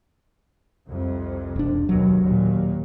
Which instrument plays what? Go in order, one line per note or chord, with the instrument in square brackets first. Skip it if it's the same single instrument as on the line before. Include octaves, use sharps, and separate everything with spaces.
[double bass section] C2 F2 C3
[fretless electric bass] E1 D4
[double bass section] F#1 D#2 B2 [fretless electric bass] F#3
[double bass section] D#2 A#2